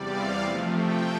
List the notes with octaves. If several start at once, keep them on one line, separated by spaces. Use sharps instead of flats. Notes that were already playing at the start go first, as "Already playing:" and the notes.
Already playing: E2 C3 G3 D5
F5
C3 F3 A3
G5